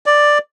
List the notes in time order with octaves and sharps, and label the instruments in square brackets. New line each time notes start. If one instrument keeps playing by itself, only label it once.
[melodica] D5